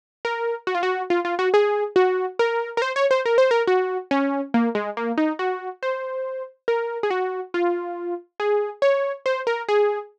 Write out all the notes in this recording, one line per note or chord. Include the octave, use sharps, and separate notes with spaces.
A#4
F#4
F4
F#4
F4
F4
F#4
G#4
F#4
A#4
A#4
C5
C#5
C5
A#4
C5
A#4
F#4
C#4
A#3
G#3
A#3
D#4
F#4
C5
A#4
G#4
F#4
F4
G#4
C#5
C5
A#4
G#4